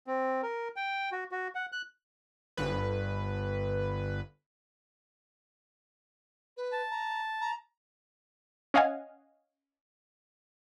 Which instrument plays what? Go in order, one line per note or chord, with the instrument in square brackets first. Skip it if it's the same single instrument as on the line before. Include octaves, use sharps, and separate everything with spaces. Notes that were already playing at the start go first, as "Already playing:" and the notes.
[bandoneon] C4
A#4
G5
F#4
F#4
F#5
F#6
[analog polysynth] G1 B4
[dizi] B4
[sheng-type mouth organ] A5
[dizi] A#5
A#5
[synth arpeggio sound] C#4 D#5 F5 F#5 G#5